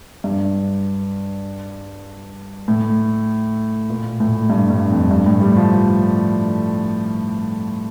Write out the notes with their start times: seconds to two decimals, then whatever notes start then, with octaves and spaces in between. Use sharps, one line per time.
0.24 G2
2.68 A2
3.90 A#2
4.20 A2
4.50 G2
4.70 G2
4.91 F2
5.11 G2
5.26 A2
5.41 G3
5.57 F3